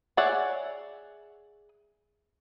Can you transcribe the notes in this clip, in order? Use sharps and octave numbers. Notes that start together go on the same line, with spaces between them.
G#4 C#5 D5 E5 F#5